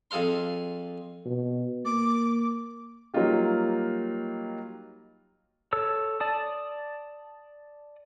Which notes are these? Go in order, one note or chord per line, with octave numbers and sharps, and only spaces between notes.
F2 G#4 A4 F5 C6
B2
A#3 D6
F#3 G3 A#3 D#4 F4 G4
A4 C#5 E6
D5 A5 D#6